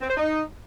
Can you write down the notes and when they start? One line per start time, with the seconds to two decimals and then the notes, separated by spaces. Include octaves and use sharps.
0.01 C4
0.09 C5
0.16 D#4